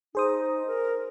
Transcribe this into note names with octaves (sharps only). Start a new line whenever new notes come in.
D#4 G#4 C5 D#6
A#4